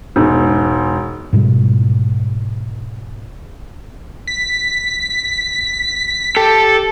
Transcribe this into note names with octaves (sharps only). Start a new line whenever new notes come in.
E1 G#2
G#2 B2 G3
B6
G4 A4